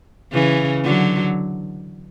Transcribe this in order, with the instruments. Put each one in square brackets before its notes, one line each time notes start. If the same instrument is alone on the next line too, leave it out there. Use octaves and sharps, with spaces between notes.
[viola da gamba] C#3 E3
D3 F#3